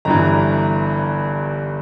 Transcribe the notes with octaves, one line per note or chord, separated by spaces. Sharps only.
G1 G2 E3 A#5